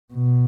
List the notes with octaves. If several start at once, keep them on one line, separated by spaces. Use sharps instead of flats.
B2